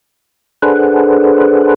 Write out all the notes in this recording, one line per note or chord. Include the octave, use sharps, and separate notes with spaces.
D4 G#4 A4 B4 C5 F#5